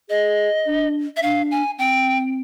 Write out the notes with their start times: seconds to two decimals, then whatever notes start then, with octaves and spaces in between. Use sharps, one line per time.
0.09 G#4 D#5
0.66 D4
1.17 E5
1.22 D4 F5
1.51 G#5
1.79 C4 G5